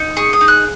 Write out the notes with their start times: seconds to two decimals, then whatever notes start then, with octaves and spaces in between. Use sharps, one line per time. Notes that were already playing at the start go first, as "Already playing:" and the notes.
Already playing: D#4
0.17 G#4 C#6
0.33 D#6
0.41 D#4
0.48 F#6